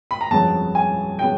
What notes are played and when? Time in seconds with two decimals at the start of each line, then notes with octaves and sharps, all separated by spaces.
0.11 B5
0.21 A#5
0.31 G1 F2 C#3 F#3 B3 A5
0.75 G#5
1.19 C#3 F#3 B3 G5